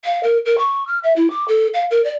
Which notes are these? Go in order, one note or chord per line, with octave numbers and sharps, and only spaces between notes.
F5
A#4
A#4
C#6
F6
E5
E4
D6
A4
F5
A#4
D5